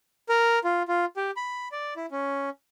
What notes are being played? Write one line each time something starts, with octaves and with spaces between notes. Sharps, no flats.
A#4
F4
F4
G4
B5
D5
E4
C#4